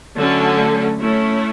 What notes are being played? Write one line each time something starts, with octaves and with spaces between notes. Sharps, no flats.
D3 F#3 A3 C#4
A3 C#4 E4